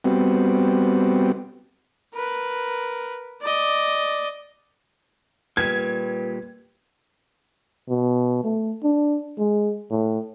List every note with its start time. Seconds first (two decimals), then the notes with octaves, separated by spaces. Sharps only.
0.04 G3 B3 C4 F#4
2.13 A#4 B4
3.42 D5 D#5
5.57 A#2 G3 B4 G#6
7.89 B2
8.43 A3
8.83 D4
9.38 G#3
9.91 A2